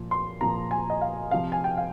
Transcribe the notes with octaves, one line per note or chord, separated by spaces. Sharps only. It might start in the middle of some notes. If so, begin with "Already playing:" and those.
Already playing: A#2 F3
C6
A#2 F3 A#5
G#5
D#5
F5
C3 F3 F5
G#5
G5
F5